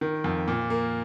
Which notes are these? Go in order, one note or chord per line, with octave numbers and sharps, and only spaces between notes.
D#3
F2
A#2
A#3